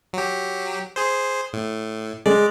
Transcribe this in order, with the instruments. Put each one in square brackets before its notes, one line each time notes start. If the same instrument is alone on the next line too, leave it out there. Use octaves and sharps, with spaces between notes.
[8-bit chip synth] F#3 G4
G#4 C5
A2
[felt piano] G#3 [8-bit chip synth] D5